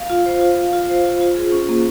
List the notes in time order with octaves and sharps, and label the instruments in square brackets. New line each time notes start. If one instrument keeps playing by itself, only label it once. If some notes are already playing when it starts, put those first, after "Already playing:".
Already playing: [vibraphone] F5
F4
C5
F4
F5
F4
C5
F4
F4
G#4
C#4
A#3